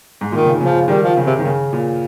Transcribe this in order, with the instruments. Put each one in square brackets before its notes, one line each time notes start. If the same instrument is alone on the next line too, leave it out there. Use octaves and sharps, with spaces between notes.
[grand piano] G#2
[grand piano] A#2 [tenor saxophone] D#3
[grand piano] C#3
[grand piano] C#3 [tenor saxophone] F3
[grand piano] D#3 [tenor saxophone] G3
[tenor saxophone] F3
[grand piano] C#3
[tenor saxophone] C3
[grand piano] D#3
C#3
A#2